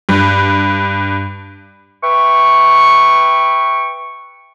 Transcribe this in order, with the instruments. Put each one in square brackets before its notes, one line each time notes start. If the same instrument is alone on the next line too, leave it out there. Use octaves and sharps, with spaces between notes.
[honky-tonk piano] G2
[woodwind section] B4 E5 G5 C#6